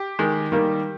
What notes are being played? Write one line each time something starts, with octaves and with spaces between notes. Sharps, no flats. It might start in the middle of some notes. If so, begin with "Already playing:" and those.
Already playing: G4
D#3 G#3
D#3 G3 A#3